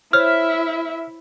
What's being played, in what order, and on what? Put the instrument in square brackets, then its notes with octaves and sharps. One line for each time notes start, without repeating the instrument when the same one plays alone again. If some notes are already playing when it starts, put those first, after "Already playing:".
[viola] E4 E5 [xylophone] C5 C#5 [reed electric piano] F6